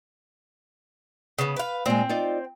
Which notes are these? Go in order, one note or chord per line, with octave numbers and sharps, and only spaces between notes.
C#3 B3
B4 F5
A#2 G#3 C4
D#4 F4 D5